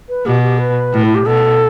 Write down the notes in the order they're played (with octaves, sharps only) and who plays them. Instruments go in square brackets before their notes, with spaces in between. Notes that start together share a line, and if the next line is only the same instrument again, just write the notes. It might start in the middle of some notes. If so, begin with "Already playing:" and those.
[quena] B4
[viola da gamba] B2 [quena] G4
[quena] G4
B4
[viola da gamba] A2
[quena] E4
G4
[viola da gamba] B2 [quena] A4